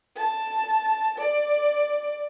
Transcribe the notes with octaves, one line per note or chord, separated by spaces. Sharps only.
A5
D5